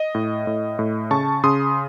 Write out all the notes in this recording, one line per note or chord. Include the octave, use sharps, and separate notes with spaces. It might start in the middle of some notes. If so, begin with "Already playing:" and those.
Already playing: D#5
A2
A2
A2
C#3 A5 C#6
C#3 C6 D#6